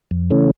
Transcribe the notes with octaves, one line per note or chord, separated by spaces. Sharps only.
F2
C#3 E3 A3 C#4